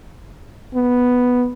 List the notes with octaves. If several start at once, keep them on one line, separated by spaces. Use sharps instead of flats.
B3